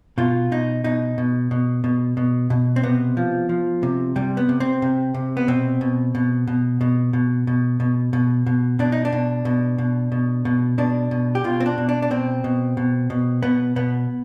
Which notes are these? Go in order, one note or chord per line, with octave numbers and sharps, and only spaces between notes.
B2 F4
B2 D#4
B2 D#4
B2
B2
B2
B2
B2
C4
C3 B3
F3
F3
C3
C3 G3
B3
C3
C4
C3
C3
B3
B2 C4
B2
B2
B2
B2
B2
B2
B2
B2
B2
B2 D4
D#4
D4
B2
B2
B2
B2
B2
B2 D4
B2
G4
B2 F4
C4
D4
B2
D4
D4
B2 C4
B2
B2
B2
B2 B3
B2 B3